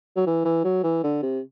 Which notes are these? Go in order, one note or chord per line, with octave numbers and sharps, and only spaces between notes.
F#3
E3
E3
F#3
E3
D3
C3